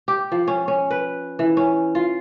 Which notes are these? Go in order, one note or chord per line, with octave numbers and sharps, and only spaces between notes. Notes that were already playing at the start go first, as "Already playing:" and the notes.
G4
F3
C#4
C#4
B4
E3
C#4
F4